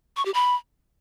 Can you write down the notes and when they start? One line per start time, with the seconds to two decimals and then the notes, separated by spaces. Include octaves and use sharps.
0.17 C#6
0.25 G4
0.34 B5